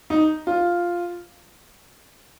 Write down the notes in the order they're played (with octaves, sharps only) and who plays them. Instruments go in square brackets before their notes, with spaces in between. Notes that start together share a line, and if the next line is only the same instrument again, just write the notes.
[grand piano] D#4
F4